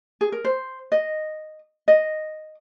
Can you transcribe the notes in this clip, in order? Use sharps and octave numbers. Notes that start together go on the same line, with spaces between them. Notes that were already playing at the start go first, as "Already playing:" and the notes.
G#4
A#4
C5
D#5
D#5